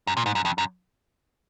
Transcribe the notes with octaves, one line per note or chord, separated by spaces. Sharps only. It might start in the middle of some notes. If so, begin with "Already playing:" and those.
F#2
A#2
G#2
F#2
F2
F#2